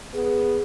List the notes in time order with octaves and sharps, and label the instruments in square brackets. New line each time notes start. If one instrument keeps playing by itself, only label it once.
[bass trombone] B3 [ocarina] G#4